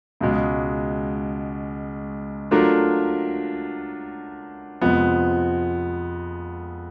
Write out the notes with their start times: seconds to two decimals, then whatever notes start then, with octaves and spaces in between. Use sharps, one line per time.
0.21 C#2 B2 G#3
2.51 F#3 A3 D4 F4 A#4
4.81 F2 C3 F3 G#3 B3